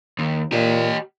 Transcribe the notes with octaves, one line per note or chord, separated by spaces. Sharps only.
D#2
A#2 G4 D#5